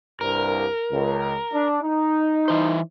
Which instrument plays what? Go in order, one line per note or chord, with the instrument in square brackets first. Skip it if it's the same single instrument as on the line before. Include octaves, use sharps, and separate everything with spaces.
[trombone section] C2 G2 [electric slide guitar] A#4
[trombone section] C#2
D4
D#4
[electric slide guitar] E3 C5